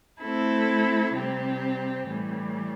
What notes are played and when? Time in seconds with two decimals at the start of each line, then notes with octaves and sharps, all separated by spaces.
0.22 A3 C4 E4 A4
1.14 C3 G3 C4 G4
2.06 A2 E3 G3